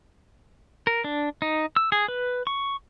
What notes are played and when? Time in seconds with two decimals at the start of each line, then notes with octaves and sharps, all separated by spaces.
0.87 A#4
1.04 D4
1.42 D#4
1.76 E6
1.92 G#4
2.08 B4
2.47 C#6